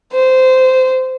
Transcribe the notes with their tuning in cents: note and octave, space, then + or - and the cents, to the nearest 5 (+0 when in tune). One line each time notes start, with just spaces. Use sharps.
C5 -15